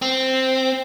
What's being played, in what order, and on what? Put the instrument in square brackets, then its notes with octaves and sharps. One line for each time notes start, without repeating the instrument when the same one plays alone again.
[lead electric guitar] C4